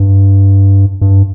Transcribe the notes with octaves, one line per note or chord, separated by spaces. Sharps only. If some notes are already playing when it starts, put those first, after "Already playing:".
Already playing: G2
G2